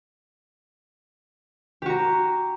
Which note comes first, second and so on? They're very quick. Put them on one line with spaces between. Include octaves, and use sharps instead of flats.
G4 F#4 A#5